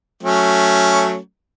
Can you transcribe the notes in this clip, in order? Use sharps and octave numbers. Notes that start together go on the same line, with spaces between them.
F#3 A3 C#4